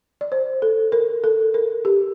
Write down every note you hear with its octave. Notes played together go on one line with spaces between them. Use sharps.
D5
C5
A4
A#4
A4
A#4
G4